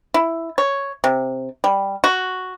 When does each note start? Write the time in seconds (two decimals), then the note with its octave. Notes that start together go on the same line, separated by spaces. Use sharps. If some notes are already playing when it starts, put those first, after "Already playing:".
0.14 E4
0.58 C#5
1.04 C3
1.64 G3
2.04 F#4